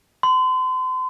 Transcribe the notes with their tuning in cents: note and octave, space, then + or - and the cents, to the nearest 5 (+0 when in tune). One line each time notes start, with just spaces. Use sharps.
C6 -35